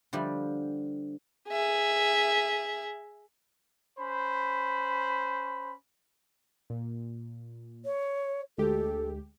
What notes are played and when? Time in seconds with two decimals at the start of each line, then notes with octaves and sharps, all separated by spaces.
0.13 D3 F3 G3
1.49 G#4 E5
3.99 C#4 C5 B5
6.70 A#2
7.85 C#5
8.58 D2 G#3 G4 A4